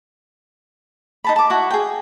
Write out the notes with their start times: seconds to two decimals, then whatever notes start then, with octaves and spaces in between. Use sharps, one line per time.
1.24 D#4 A5 B5
1.36 A5 D6
1.50 E4 F#4
1.71 G#4 G5